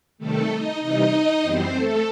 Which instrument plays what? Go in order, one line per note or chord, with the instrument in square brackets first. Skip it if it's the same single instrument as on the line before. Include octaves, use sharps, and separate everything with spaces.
[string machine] C3 D#3 G3 A3 A4
D#4 D#5
C3 E3 G3 D#4 D#5
F#2 E3 G3 B3 C4 C5
A3 A4